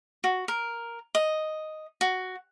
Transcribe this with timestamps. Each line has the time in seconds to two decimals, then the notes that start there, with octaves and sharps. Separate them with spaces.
0.24 F#4
0.48 A#4
1.15 D#5
2.01 F#4